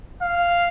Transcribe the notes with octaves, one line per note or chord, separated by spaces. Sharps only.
F5